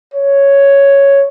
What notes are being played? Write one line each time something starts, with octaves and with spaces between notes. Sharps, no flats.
C#5